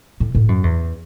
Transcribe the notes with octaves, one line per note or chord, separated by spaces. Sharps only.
A2
A2
F#2
E2